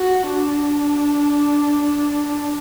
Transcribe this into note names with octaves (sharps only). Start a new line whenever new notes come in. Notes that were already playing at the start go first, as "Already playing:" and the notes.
Already playing: F#4
D4